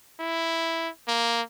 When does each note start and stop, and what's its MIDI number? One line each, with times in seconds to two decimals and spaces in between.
0.20 0.89 64
1.08 1.42 58